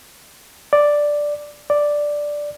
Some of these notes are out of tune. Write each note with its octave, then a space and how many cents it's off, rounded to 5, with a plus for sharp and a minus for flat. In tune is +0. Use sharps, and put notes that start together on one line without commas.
D5 +0
D5 +0